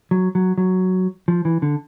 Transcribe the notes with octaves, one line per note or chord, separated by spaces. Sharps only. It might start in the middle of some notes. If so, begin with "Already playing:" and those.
F#3
F#3
F#3
F3
E3
D3